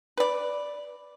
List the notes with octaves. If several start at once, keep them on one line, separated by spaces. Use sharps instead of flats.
B4 D5